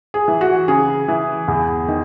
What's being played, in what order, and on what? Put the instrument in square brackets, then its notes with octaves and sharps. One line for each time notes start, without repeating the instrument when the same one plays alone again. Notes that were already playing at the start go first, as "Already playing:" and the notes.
[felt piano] G#4
E3
F#4
C#3 G#4
E3
E2
D#3